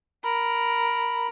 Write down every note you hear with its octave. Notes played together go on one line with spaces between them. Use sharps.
A#4 B5